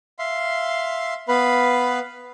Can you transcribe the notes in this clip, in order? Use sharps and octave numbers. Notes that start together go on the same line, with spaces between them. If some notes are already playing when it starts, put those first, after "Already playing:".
E5 F5 C6
B3 B4 F5 B5